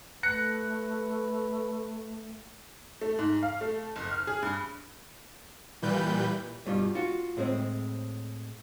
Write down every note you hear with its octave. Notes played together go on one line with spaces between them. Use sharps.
A3 B4 F#6 A#6 C#7
A3
G#2
F5
A3
F#1
F6
G#4
G2
A#2 E3 G3 B4 G6
G2 B2 G3 F4
F4 F#4
A2 G#3 C4